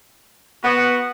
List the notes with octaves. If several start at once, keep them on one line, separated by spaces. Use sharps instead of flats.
B3 F#4